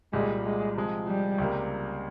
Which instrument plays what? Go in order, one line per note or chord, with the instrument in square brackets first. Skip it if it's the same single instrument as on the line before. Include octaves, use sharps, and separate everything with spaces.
[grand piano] C2 A#2 G3 [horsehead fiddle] G#3
[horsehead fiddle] G#3
[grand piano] C3 F3 G#3
[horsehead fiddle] G3
[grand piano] C#2 C3 G3 A#3